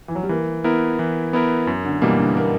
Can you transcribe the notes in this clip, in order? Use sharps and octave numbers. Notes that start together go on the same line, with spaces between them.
E3
F#3
G3
E3 A#3
B3 E4 A#4
E3
B3 E4 A#4
F#2
D3
B2 E3 G3 A#3
D3
A#3